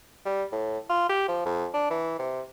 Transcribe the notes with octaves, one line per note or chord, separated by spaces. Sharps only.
G3
A2
F4
G4
F3
F2
D4
E3
C3